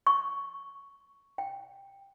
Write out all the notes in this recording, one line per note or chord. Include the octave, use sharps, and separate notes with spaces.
C#6
G5